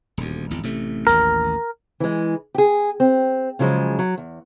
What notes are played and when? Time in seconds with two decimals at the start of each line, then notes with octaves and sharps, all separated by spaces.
0.18 D#1 D2
0.51 G#1 E2
0.63 A1 C3 A3
1.07 A1 D#2 A#4
2.00 E3 G#3
2.54 G4 G#4
3.00 C4
3.59 C#3 F3 F#3 G#3
3.99 F#3
4.18 E2